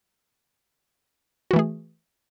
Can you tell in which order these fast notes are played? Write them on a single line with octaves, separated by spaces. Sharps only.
F#4 E3 A3 G#4